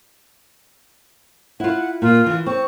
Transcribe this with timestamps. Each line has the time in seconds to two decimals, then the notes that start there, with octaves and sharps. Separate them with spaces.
1.60 E4 F4 F#5
2.02 A#2 F4
2.26 E3
2.46 C4 C#6